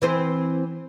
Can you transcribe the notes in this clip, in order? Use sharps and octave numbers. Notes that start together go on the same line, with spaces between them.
E3 C4 C5